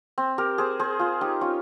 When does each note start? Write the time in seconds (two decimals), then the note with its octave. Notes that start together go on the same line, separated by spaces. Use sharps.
0.18 C4
0.38 G4 A#4
0.58 G#4 C5
0.80 G#4 C5
0.99 F4 G#4
1.21 D#4 G4
1.41 C#4 F4